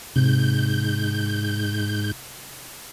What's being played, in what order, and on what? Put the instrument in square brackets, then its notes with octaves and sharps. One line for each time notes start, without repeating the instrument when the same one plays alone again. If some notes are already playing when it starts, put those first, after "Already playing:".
[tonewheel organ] G#2 G6 [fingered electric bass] C3